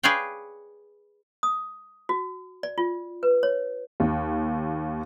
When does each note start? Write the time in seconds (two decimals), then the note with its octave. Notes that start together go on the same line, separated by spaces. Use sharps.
0.03 G#4 B4 C#5 D5 F5 G5
1.43 D#6
2.09 F#4
2.63 D5
2.78 F4
3.23 B4
3.43 C#5
4.00 D#2